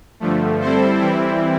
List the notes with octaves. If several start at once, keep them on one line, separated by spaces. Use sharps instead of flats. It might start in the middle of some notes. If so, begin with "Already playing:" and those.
G2 D3 F3 A3
G3 C4 E4 A4 C5
E3 G3 C4 E4